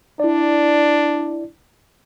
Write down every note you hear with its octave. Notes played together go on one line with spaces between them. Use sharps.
D4 E4 D5